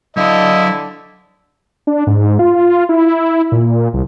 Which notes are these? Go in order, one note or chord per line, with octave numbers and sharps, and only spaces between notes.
D3 F#3 E4 D#5 F5
D4
G#2
F4
E4
A#2
C2